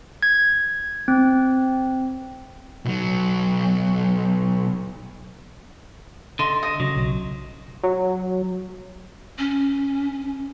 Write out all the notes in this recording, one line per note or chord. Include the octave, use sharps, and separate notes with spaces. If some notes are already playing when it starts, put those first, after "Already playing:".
G#6
C4
B1 F#3
D3 D#5 C6
D#5
C#3 F#3
B1
F#3
C#4